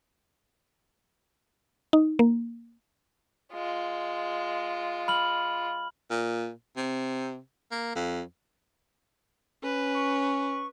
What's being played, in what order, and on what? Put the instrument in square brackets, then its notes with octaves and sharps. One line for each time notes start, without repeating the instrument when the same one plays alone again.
[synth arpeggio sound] D#4
A#3
[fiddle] G#3 F4
[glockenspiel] B5 F6 F#7
[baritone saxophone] A#2
C3
A#3
F2
[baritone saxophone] C#4 [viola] B4
[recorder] C#6